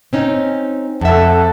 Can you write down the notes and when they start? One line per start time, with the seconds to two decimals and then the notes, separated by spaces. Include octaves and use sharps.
0.13 C4 C#4 D#4
1.01 F2 A4 E5 F#5 A5